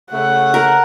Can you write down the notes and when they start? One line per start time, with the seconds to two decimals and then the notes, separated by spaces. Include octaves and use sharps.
0.12 C#3 A3 F#5
0.54 A#4